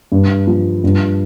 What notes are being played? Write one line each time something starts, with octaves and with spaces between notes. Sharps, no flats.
G2
F3
G2